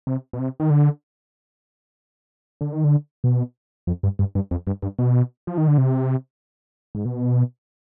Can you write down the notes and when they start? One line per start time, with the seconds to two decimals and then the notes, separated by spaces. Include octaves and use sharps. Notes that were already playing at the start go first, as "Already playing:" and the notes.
0.07 C3
0.33 B2
0.39 C3
0.60 D#3
0.70 D3
2.61 D3
2.73 D#3
2.84 D3
3.24 B2
3.87 F2
4.03 G2
4.19 G2
4.35 G2
4.51 F2
4.67 G2
4.82 G2
4.99 B2
5.47 F3
5.58 D#3
5.68 D3
5.78 C3
6.95 G#2
7.05 B2